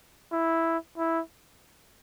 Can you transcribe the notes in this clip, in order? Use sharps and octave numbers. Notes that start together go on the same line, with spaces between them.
E4
E4